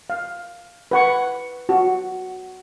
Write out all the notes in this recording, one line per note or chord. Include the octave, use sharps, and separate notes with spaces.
F5
B4 F#5 C#6
F#4